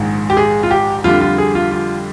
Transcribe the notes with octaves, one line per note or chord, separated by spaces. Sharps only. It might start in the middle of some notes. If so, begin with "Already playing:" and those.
Already playing: A#1 G#2 D#3 G#3
G4
G#4
F4
G4
F2 D3 G3 D4 F4
F4
G#4
F4
F4